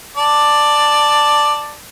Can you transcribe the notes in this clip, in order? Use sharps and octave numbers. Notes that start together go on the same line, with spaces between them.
D5 A5